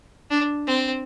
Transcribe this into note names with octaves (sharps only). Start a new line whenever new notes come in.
D4
C4